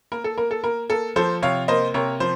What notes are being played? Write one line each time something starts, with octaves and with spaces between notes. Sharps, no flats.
A#3 A#4
A4
A#3 A#4
A4
A#3 A#4
A#3 A4
F3 A4 C5
C3 C#5 F5
A#3 C5 D#5
C3 A#4 C#5
F3 C5